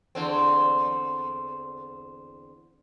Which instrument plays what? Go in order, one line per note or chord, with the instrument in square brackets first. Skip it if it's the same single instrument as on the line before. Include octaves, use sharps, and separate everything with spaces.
[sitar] E2 D3 C4